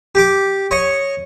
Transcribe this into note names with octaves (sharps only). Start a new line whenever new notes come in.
G4 D6
C#5 D#5 C#6